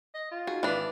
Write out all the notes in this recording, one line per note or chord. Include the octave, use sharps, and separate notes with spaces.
D#5
F4
D#4 F#4 G#4
G#1 E3 D4 B4